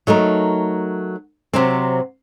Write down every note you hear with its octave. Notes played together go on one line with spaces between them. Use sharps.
F#3 A3 D#4 A#4
C3 F#3 C4